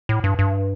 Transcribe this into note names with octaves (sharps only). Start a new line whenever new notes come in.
A2
G2
G2